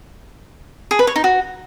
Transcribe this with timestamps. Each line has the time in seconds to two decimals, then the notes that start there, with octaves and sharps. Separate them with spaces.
0.91 G#4
0.99 B4
1.07 C#5
1.16 D#4
1.24 F#4